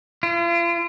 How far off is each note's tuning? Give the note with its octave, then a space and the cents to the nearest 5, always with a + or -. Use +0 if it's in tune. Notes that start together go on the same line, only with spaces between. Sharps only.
F4 -45